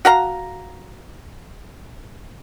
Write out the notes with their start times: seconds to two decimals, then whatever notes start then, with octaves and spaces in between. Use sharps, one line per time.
0.05 F#4 F5 A#5